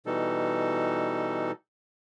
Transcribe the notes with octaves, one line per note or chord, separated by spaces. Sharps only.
B2 E3 G3 D#4 A4